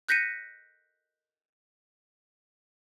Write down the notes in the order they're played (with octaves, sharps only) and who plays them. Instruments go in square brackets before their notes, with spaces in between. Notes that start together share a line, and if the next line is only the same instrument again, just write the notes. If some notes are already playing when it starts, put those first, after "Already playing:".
[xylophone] F#6 G6 A#6 B6 C#7 D#7